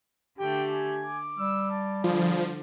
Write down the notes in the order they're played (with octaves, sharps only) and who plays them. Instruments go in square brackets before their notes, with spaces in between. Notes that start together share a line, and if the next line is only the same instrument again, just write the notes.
[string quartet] D3 A3 [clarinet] G4 [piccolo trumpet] G5
[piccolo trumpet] G#5
[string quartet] D6
[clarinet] G3 [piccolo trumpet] E6
[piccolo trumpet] A5
[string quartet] D3 [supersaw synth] F3 [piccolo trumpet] G#4